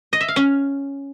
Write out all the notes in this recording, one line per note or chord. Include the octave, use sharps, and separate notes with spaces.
D#5
E5
F5
C#4